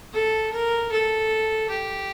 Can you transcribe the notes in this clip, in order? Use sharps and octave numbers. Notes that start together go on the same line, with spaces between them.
A4
A#4
A4
G4